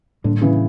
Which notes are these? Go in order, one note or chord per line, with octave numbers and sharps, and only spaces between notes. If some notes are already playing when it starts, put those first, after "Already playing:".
A2 D3 G3 A#3 D4
C#3 E3